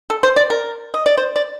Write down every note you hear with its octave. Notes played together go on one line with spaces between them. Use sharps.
A4
C5
D5
A#4
D#5
D5
C5
D5